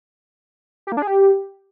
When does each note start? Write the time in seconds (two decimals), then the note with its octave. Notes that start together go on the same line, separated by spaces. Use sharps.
0.87 G4
0.92 A#3
0.97 D4
1.02 G#4
1.07 G4